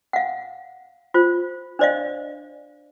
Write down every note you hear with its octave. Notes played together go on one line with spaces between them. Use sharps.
F5 F#5
F4 C5
D4 C5 D5 D#5 F5